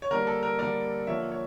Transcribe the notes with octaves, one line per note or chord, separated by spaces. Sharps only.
C#5
D3 G3 A#3 D4 A#4
A4
A#4
D3 G3 A#3 D4 A#4 D5
D3 F3 A#3 C#5 E5
C#5